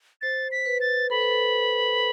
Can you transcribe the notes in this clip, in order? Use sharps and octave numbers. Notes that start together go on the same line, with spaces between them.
C5 A6
B6
B4
A6
A4 B5
B4
A4